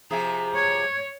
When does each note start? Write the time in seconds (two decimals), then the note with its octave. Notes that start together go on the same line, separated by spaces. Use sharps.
0.11 C3 F3 G#4 A#5
0.56 C#5 G#6